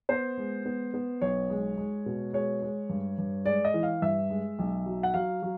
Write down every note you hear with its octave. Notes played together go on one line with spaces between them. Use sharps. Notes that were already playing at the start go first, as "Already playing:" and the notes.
B3 C5
G#3
B3
B3
B1 C#5
G#3
G#3
B2
G#3 C#5
G#3
G2
G2
G#3 D5
D#5
E3
F5
G2 E5
G#3
B1
F#3
F#5
F#3 F5
F#3